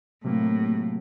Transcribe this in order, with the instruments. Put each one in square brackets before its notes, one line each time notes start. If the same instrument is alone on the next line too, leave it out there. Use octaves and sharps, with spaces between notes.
[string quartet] A2 [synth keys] C3 F#3 A#3